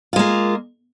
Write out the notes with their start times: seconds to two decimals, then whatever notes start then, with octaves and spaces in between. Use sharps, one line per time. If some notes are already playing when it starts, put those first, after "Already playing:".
0.13 F4
0.16 G#3
0.19 A#3